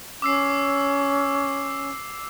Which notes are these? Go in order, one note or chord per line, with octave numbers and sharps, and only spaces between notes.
C#4 D6 E6 C7